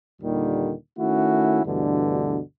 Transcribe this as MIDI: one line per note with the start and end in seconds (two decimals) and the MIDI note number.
0.22 0.73 39
0.22 0.73 46
0.22 0.73 50
0.22 0.73 51
0.22 0.73 55
0.98 1.64 51
0.98 1.64 57
0.98 1.64 61
0.98 1.64 64
0.98 1.64 66
1.64 2.39 38
1.64 2.39 43
1.64 2.39 47
1.64 2.39 50
1.64 2.39 52